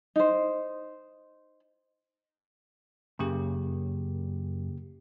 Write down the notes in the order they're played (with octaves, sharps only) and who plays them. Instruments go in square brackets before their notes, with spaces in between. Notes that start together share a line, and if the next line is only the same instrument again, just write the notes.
[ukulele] D#4 C5
[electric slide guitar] F#2 [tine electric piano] C#3 A#3 G4